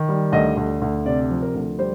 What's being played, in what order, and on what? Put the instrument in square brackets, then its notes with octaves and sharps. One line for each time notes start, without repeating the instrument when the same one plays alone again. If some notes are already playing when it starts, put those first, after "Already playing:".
Already playing: [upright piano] D#3
G3
D2 D#5
D2
D2
C3 D5
F3
A#4
D2
G3 C5